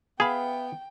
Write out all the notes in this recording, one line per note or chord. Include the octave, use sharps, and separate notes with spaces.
B3 G#4 E5 F5 G5 B5